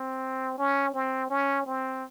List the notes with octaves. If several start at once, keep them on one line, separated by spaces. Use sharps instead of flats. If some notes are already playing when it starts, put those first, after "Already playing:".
Already playing: C4
C#4
C4
C#4
C4